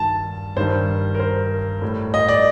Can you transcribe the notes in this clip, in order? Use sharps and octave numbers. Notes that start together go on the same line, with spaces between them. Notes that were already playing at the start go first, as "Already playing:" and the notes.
Already playing: G2 D#3 G3 A5
G2 D#3 G3 C5
A#4
C5
A2 G3
D#5
D5